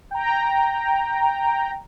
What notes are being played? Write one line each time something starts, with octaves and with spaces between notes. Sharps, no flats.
G5 A#5